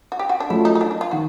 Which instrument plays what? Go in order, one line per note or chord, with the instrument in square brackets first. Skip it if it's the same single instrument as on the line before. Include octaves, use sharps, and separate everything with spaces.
[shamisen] F#4
G4
F#4
D4
[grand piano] F#3 A3 C#4 F4 [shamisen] E4
[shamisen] D#4
D#4
D4
D#4
F4
[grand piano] D#3 [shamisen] F#4